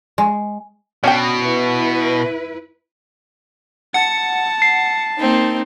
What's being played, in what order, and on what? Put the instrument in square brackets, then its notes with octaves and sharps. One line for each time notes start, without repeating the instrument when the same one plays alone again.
[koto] G#3
[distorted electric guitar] B2 [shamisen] C#4 D4 G5
[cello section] E4 B4
[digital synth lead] F#5 [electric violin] A5
[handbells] C7
[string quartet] A#3 C4 D#4